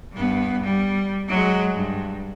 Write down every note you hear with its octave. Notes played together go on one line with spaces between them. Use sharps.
G2 B3
G3
F#3 G#3
G2